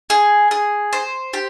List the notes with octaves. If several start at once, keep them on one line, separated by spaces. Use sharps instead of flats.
G#4
G#4
C5
G4